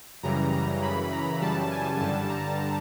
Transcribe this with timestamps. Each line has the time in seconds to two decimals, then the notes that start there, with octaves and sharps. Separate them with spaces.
0.23 F#2 C#3 E3 G3 A#5
0.53 A#5
0.82 F#2 C#3 E3 B5
1.12 A#5
1.41 F#2 C#3 E3 G3 A5
1.71 G#5
2.00 G2 D3 G3 A5
2.29 A#5